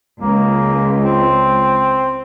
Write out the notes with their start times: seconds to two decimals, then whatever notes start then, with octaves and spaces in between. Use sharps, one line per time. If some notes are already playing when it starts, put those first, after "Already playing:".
0.21 C#2 A#3
1.05 C4